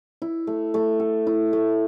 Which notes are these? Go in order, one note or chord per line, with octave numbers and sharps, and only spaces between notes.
E4
A3
A3
A4
E4
A3